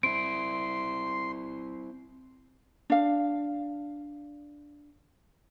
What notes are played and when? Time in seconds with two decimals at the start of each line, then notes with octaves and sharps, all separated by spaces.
0.03 C4 E4 C6 D7
2.90 D4 F5